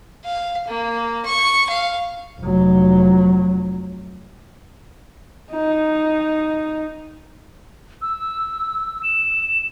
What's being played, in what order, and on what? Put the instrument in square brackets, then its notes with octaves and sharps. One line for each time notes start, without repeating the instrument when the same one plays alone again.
[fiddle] F5
A#3
C#6
F5
[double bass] F1 F#3
[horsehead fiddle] D#4
[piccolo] E6
E7